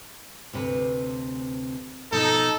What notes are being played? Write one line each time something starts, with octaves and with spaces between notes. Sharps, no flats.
D2 C3 B4
B2 F3 D#4 A4